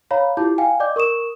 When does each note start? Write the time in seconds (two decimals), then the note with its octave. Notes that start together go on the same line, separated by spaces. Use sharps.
0.11 C#5 F5 A#5 B5
0.37 E4 F4 G4 A5 D6 G6
0.58 F5 G5 G#5
0.80 D5 D#5 D6 G6
0.96 A#4 C#6 D#6 E7